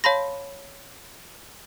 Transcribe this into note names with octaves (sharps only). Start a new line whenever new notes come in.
C#5 F5 A5 B5 C6 A#6